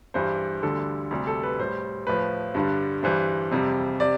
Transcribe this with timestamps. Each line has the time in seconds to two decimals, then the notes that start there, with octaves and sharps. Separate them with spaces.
0.14 G2 E3 G3 C5
0.62 D2 D3 G3 A4
1.11 D2 C3 G3
1.27 A4
1.43 B4
1.59 A2 G3 C5
2.07 A2 F3 B4
2.54 G2 D3 G3
3.03 G2 E3 G3 C5
3.51 F2 C3 G3
4.00 C3 D5